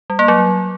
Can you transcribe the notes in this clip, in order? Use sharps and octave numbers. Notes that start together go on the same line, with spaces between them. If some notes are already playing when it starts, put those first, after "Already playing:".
G3
A#3
F#3